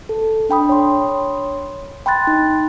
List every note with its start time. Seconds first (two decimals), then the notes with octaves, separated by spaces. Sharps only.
0.09 A4
0.49 D4 G5 B5 D#6
0.69 C#5 C6
2.06 G5 B5 C6 F#6 A6
2.27 D#4